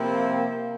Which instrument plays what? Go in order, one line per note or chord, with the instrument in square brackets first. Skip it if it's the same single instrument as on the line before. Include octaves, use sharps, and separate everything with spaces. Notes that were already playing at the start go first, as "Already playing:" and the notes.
Already playing: [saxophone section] C3 F3 C4 E4 [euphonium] A#3